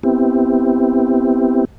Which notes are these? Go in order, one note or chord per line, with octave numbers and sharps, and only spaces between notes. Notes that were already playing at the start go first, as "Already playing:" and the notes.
B3 C4 E4 G4